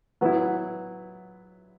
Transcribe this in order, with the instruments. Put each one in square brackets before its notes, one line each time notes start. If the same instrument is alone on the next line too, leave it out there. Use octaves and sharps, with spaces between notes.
[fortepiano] F#3 B3 E4